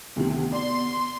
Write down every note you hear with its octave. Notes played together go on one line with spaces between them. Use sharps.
D2 C3 D#3 B3
D5 C6